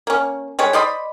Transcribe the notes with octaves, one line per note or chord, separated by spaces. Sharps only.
A#3 C#4
G3 G#3 B4 C#5
C5 D5 D#5 B5